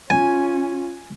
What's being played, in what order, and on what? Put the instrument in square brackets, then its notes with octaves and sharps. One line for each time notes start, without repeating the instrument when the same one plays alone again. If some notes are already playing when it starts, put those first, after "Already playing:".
[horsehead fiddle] C#4 F4 [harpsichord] G#5